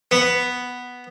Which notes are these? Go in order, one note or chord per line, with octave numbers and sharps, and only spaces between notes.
B3